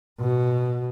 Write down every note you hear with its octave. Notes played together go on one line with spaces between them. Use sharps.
B2